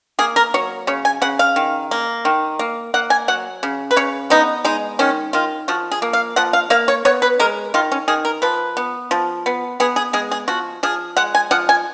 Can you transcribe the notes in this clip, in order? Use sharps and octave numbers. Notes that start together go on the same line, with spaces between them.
A#3 G#4
A#4
F#3 C#5
C#3 C#5
G#5
C#3 F#5
F5
D#3
A#3
D#3
A#3
A#3 F#5
G#5
F#3 F#5
C#3
B4
C#3 C#5
B3 D#4
G#3 D#4
D#3 C#4
D#3 F4
F3 F#4
G#4
A#3
F5
F3 F#5
F5
A#3 F5
C#5
B3 C#5
B4
G#3 A#4
D#3 F4
C#4
D#3 G#4
A#4
F3 B4
B3
F3
B3
B3 G#4
G#4
G#3 G#4
G#4
F3 F#4
F3 G#4
G#3 F#5
G#5
F3 F#5
G#5